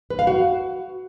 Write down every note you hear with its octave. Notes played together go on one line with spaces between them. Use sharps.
B4
F5
F#4